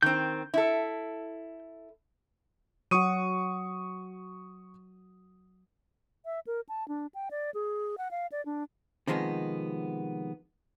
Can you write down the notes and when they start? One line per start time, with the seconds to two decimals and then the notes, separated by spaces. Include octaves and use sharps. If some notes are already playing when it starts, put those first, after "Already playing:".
0.03 D#3 C4 G6
0.54 E4 A4
2.91 F#3 F#4 C#6 D#6 D#7
6.25 E5
6.47 A#4
6.69 A5
6.88 D4
7.15 G5
7.31 D5
7.54 G#4
7.98 F#5
8.11 F5
8.32 D5
8.46 D4
9.07 C3 D#3 F3 G#3 B3